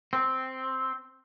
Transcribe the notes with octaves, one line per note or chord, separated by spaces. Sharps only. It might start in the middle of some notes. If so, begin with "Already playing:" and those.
C4